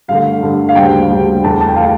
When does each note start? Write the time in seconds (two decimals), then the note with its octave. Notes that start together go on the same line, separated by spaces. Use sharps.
0.08 G2 D3 A3 F5
0.42 G2 D3 A3
0.69 F5
0.75 D2 C#3 G3 A#3 G5
1.10 D2 C#3 G3 A#3
1.43 E2 E3 A3 A5
1.61 A5
1.68 G5
1.76 E3 A3 F5